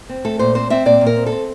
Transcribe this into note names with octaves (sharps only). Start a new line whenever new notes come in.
C4
A3 A4
A#2 C5
C4 C5
C4 E5
A#2 D5
A#2
A#4
C4
A4
C4